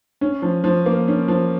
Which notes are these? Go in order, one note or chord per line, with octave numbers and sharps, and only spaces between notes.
C#4
F3
F3
A#3
C#4
F3